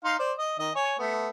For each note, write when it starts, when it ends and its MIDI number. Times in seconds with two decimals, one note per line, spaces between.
0.04 0.16 63
0.04 0.16 77
0.04 0.16 84
0.19 0.33 72
0.19 0.33 74
0.38 0.55 75
0.59 0.71 51
0.59 0.71 75
0.75 0.95 73
0.75 0.95 80
0.99 1.29 57
0.99 1.29 59